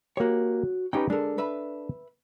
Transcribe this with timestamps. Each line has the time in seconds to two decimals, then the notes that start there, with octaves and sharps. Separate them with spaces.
0.17 A#3 F#4 G4 C#5
0.93 C#4 D#4 G4 B4 G5
1.10 G#3 D4 A4 A#4
1.38 B4 E5 B5